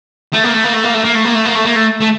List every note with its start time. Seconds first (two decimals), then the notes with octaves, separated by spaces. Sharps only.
0.33 A3
0.43 A#3
0.53 A3
0.64 A#3
0.74 A3
0.84 A#3
0.94 A3
1.04 A#3
1.14 A3
1.25 A#3
1.35 A3
1.45 A#3
1.55 A3
1.65 A#3
1.75 A3
2.00 A3